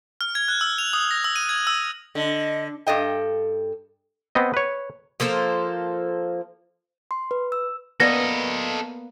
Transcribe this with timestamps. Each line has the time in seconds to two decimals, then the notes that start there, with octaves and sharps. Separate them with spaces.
0.21 F6
0.35 G#6
0.48 F#6
0.61 E6
0.78 F7
0.93 D#6
1.11 A#6
1.24 E6
1.36 D#7
1.49 G#6
1.67 E6
2.15 D3 D#5
2.87 G2 A4 D#5 G5
4.35 B3 C4 D#5
4.54 B4 C#5
5.20 F3 A#3 A4 C5
7.11 C6
7.31 B4
7.52 E6
8.00 A#3 B3 A4 B4 D5 D#5 A#6